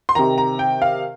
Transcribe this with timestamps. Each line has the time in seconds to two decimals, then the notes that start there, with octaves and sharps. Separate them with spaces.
0.09 C6
0.15 C3 D#3 A#5
0.38 A#5
0.59 G5
0.82 F5